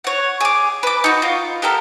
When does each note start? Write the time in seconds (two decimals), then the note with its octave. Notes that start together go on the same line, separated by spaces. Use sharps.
0.04 C#5 F#5
0.41 G#4 D6
0.83 B4 D6
1.04 D#4 F#4
1.22 F4
1.62 B3 G4 A4 A#4